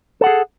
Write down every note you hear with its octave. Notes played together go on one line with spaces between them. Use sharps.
G#4 A4 F#5